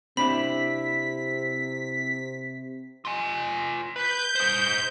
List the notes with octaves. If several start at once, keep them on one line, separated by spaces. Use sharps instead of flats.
C3 C4 D4 E4 B5 B6
F4 G#5
B4 G6
G#4 C5